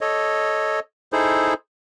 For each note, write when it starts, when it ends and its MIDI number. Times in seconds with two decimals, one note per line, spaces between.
0.01 0.80 69
0.01 0.80 73
0.01 0.80 75
1.13 1.54 63
1.13 1.54 64
1.13 1.54 68
1.13 1.54 69
1.13 1.54 72